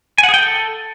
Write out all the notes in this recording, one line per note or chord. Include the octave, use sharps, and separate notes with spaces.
G#5
F#5
G#4
G5
A4